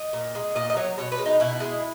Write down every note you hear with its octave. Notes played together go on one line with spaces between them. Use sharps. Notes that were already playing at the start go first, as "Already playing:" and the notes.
Already playing: D#5
A#2
G#3
A#2 D#5
D#5
F#3 C#5
B2 C#5
B4
G#3
D#4
B2 E4
G#3